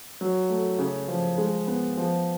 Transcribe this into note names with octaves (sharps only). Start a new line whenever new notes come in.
F#3
A3
C#3
F3
G#3
B3
F3